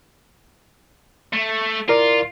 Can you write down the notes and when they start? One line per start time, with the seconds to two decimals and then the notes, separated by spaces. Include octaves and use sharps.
1.33 A3
1.88 E4 F4 A#4 D5